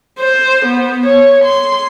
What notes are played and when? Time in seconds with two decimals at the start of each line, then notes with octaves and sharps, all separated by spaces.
0.19 C5
0.66 B3
1.07 C#5
1.45 C6